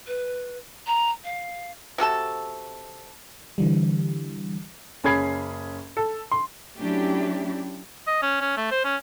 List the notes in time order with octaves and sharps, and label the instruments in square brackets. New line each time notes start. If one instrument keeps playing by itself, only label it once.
[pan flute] B4
A#5
F5
[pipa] C3 F#4 A4 A5
[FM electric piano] D3 E3 G3
[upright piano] F#1 C#4 G#4 B5 G#6 C7
A4
C6
[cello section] F#3 A3 C#4 D4 E4 G4
[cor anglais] D#5
C#4
C#4
A3
C5
C#4